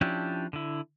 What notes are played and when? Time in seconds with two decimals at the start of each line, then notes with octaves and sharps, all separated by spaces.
0.01 F3 C#4 D4 E4 G4
0.53 D3 E4